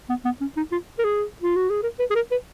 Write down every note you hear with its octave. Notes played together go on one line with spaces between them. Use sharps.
B3
B3
C#4
D#4
F4
A#4
G#4
F4
F#4
G#4
A#4
B4
G#4
A#4
B4